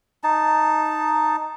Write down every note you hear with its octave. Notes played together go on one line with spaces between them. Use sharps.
D#4 A5